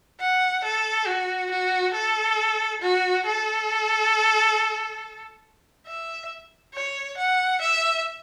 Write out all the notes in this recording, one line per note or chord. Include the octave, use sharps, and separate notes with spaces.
F#5
A4
F#4
F#4
A4
F#4
A4
E5
C#5
F#5
E5